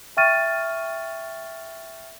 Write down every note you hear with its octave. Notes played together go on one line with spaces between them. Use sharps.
E5 G5 C#6 F6 A6 D#7